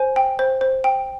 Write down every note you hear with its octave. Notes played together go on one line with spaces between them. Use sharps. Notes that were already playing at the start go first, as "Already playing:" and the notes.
Already playing: C5 G#5
G5
C5
C5
G5